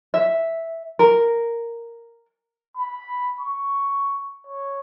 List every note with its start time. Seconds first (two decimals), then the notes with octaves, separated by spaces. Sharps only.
0.14 E5
0.99 A#4
2.77 B5
3.40 C#6
4.47 C#5